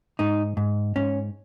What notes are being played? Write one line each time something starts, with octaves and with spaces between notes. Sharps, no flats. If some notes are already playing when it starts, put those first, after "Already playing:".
G#2 D#4
G#2
G#2 C#4